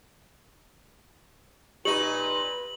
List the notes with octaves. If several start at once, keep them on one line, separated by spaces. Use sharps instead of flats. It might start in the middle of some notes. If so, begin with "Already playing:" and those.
A#2 D#4 G4 B4 F#7